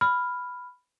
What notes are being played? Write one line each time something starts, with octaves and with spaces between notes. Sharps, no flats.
B5 F6